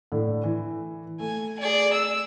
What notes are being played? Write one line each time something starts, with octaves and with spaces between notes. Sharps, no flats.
A2 D3
E3
A3 G#5
G#4 D5
E6